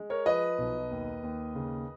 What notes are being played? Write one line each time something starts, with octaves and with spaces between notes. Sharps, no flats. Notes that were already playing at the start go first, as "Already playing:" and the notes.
Already playing: G#3
A#4 C#5
F3 B4 D#5
B1
D#2
D#2
C#3